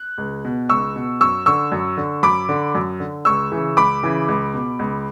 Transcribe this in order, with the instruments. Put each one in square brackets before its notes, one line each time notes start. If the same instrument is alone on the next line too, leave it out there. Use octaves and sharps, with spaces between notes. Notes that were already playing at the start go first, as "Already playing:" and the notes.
Already playing: [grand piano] F#6
C#2
B2
C#2 C#6 E6
B2
F#2 C#6 E6
D3 C#6 E6
F#2
D3
F#2 B5 D6
D3
F#2
D3
C#2 C#6 E6
C#3 E3
C#2 B5 D6
C#3 E3
C#2
B2
C#2